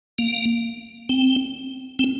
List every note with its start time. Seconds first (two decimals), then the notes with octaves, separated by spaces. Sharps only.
0.18 A#3
1.09 C4
1.99 C4